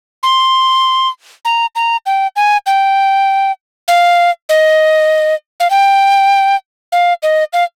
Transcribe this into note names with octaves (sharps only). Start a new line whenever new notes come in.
C6
A#5
A#5
G5
G#5
G5
F5
D#5
F5
G5
F5
D#5
F5